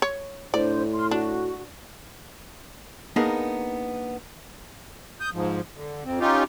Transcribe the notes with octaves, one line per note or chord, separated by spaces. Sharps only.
C#5
A2 D4 C5 D5
C6 F6
D4 F#4
A#3 B3 D4 D#4 G#4 A#4
D#6 G6
G#2 F3
D3
F2 C4
C#4 D#4 F4 G4